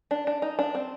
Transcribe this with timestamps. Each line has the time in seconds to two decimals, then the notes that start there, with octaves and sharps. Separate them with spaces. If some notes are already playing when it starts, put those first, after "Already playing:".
0.11 D4
0.27 D4
0.42 D#4
0.59 D4
0.75 C4